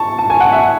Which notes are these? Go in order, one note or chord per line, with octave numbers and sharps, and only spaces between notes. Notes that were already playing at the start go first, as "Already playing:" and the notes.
Already playing: A5 C#6
A5
G#5
F#5
E5